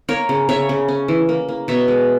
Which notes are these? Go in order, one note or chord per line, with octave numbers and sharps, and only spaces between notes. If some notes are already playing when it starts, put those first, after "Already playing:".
A#3 A#4 C#5
C#3
C#3 C#5 E5
C#3
C#4
E3
A#3
A#3
B2 C#5 E5
G#3